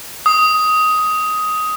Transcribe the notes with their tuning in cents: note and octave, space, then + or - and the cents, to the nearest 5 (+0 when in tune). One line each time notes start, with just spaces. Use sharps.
D#6 +10